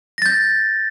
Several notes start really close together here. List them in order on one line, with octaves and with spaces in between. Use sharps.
A#6 A6 G6